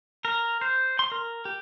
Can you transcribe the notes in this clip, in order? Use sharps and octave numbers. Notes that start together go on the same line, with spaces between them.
A#4
C5
C6
A#4
G4